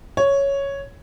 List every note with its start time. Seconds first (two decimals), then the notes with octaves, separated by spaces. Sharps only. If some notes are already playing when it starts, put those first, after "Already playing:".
0.17 C#5